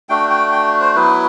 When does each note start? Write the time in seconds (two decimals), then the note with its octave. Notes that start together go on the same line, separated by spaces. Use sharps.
0.09 A3 D4 F#4 G5
0.30 G5
0.52 G5
0.81 C5
0.95 F#3 B3 E4 B4